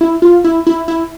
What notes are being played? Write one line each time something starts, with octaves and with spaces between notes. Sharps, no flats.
E4
F4
E4
E4
E4